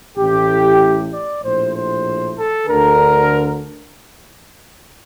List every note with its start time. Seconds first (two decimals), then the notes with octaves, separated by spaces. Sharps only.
0.16 A1 A2 G4
1.11 D5
1.42 A#1 A2 C5
1.73 C5
2.35 A4
2.67 D2 D3 A#4